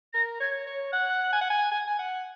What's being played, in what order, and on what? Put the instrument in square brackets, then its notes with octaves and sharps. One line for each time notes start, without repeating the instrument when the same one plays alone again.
[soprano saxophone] A#4 [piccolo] A#6
[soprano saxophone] C#5 [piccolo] G#6
[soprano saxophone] C#5
[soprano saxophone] F#5 [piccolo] F#6
[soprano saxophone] G#5
F#5
G#5
G#5
G#5
F#5